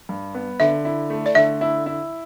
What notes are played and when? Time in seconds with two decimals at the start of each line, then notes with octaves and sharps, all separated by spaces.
0.09 G2
0.35 B3
0.60 D3 E5
0.85 E4
1.10 A3
1.26 D5
1.35 D3 E5
1.61 E4
1.86 E4